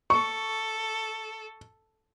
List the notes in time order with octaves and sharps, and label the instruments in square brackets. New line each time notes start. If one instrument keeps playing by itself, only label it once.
[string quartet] A4 [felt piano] C#6